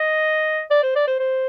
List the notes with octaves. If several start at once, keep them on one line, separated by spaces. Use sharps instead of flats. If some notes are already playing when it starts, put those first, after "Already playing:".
Already playing: D#5
D5
C5
D5
C5
C5